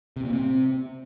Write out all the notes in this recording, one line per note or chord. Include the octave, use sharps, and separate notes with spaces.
C3
A#2
C3